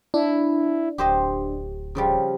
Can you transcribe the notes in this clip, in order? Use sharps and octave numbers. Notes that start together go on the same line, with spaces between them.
D4 E4
D1 G4 C5 D#5
C#3 F3 G3